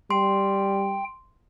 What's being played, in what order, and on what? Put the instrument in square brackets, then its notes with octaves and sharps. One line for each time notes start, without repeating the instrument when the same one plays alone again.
[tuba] G3 [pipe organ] G5 [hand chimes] C6